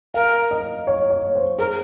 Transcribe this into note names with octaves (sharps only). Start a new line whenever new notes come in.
A#4 F5
D#5
C#5
C#5
C5
G#4 A#4